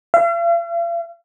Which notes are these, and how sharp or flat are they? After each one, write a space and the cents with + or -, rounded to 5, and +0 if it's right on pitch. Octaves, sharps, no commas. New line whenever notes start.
F5 -45